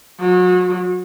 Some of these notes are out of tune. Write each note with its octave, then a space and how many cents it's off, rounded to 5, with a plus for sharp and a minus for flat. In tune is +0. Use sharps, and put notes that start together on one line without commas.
F#3 -35